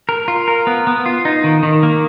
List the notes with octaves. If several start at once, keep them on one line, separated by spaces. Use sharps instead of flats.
A#4
F4
A#4
B3
B3
F4
D#4
D#3
D#3
A#3